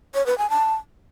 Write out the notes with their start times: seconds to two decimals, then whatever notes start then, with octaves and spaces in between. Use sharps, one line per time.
0.14 C#5
0.26 B4
0.38 G#5
0.50 A5